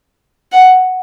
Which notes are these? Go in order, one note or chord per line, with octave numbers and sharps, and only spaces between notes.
F#5